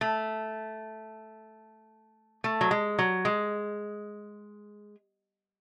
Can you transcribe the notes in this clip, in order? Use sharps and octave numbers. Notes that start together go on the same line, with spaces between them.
A3
A3
F#3
G#3
F#3
G#3